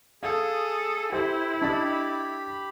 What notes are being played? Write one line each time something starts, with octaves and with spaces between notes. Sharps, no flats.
G#4 A4 F5 D#6
E4 G4 C5
D4 G4 D#5 B5 A6